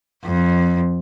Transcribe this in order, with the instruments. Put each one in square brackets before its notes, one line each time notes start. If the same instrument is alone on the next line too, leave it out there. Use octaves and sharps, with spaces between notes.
[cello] F2